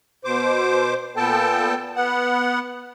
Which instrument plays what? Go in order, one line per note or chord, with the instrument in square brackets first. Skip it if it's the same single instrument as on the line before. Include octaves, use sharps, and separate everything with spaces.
[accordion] B2 C5 D6
A#2 B3 A4 G5 A5
B3 F#5